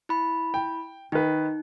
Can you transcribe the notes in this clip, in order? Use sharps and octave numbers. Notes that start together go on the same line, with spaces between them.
E4 B5
G5
D#3 D#4 B4